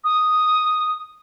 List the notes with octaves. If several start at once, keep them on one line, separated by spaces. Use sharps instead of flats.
D#6